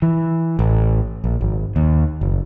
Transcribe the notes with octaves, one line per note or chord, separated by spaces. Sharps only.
E3
A1
A#1
G#1
D#2
F#1